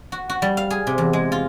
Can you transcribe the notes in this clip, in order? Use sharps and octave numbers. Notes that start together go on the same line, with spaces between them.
F#4
F#4
G3
F5
G#4
C3
E2
G#3
F4